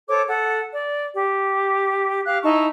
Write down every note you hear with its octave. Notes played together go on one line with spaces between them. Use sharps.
A4 C5 C#5 D6
A4 F#5
D5
G4
G4 F5 F#6
D#4 E4 A5 C#6